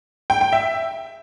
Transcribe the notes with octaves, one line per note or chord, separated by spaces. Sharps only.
G5
G5
E5